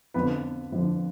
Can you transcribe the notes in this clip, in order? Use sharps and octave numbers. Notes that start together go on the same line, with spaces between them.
F2 D3 F3 B3
F2 D3 F3